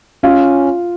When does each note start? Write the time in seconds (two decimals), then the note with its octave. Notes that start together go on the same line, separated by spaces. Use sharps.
0.23 C#4 F4 F5